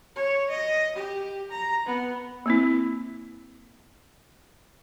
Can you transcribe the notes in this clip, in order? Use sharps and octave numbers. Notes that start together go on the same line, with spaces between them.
C#5
D#5
G4
A#5
B3
A#3 C4 E4